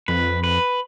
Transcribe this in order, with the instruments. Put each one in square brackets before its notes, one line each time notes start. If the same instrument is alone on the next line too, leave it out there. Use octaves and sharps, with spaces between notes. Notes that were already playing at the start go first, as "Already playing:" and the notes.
[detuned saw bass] F2 [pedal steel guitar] B4
[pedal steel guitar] B4